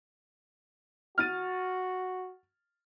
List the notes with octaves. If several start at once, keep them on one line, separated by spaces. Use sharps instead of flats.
F#4 F6 A6 D#7